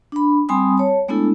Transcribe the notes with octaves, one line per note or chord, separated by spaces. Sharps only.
D4 B5
G3 C4 G#5 B5 C6 D#6
C#5 A5
G#3 A3 B3 D4 E4 A4